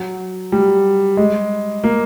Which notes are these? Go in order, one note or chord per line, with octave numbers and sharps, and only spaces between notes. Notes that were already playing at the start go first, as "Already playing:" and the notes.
Already playing: F#3
G3
G#3
A#3